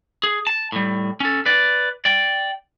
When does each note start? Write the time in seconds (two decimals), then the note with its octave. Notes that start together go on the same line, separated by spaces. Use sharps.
0.23 G#4
0.47 A5
0.72 A2 G3
1.20 C#4 A4
1.46 B4 D5
2.05 D5 G5